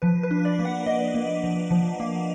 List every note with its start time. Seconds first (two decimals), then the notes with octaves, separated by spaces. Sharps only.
0.02 F3 B4
0.23 B4
0.31 D4
0.45 D5
0.59 A#3
0.65 F#5
0.86 A#3 D#5
1.14 A#3
1.44 F3
1.71 F3
2.00 A#3